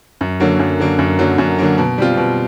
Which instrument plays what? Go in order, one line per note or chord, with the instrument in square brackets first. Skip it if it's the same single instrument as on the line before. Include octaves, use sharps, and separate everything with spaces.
[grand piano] F#2
D3 F#3 A#3
F#2
D3 F#3 A#3
F#2
D3 F#3 A#3
F#2
D3 F#3 A#3
B2
G3 C4 F4
B2